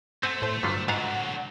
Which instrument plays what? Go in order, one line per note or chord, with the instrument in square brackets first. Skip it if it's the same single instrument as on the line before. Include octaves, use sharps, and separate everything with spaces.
[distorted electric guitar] A3 [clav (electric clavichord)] C4 F#5 G#5 [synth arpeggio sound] C5
[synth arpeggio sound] A2 C5
[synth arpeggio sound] G2 [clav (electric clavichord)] D3 F#3 F4
[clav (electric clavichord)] G#2 F4 F5 [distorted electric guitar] D3 F#3 [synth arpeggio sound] F#5